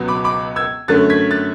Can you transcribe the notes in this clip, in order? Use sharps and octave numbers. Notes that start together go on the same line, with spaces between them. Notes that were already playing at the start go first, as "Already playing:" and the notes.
Already playing: C#2 B2 F#3 B3
B5 D6
B5 D6
E6 G#6
F#2 D3 A3 C#4 F#6 A6
G#6 B6
F#6 A6